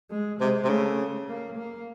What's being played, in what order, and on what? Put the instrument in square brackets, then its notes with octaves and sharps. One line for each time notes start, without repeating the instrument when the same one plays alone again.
[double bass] G#3
[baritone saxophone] C3 [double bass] G#3
[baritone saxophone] C3
[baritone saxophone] C#3 [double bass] A3
[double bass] A#3
A#3